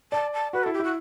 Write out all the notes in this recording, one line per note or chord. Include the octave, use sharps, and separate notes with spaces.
D5 A5
A5
F#4 B4
A4
E4
G4
E4 F#4